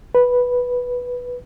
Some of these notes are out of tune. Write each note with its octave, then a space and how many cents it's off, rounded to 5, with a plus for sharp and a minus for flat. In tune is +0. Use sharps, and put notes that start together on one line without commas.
B4 -5